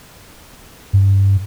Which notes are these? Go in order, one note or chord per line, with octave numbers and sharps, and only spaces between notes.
G2